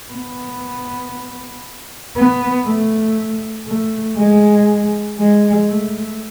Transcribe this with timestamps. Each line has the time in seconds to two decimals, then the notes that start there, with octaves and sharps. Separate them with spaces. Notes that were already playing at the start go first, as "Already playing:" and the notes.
0.13 B3
2.16 B3
2.65 A3
3.67 A3
4.17 G#3
5.19 G#3
5.69 A3